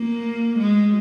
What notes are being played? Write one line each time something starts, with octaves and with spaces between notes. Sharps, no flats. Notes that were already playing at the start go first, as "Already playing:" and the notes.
Already playing: A#3
G#3